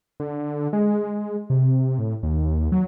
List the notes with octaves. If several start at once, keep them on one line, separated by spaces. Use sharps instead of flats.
D3
G#3
C3
A2
D#2
F#3